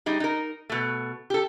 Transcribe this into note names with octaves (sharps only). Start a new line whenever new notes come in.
G3 D#4 G#4
D#4 A#4
B2 A3
G4 A4